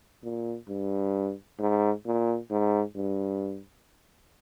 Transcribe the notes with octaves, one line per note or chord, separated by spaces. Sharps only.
A#2
G2
G#2
A#2
G#2
G2